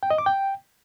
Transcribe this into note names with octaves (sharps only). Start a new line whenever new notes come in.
G5
D#5
D6
G5